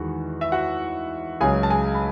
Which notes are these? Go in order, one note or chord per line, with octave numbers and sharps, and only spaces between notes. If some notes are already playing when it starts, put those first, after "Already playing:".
Already playing: E2 D#3 G#3 F#4
E5
F#4 F#5
C#2 C#3 F#3 G#4 G#5
A5
G#4 G#5
B5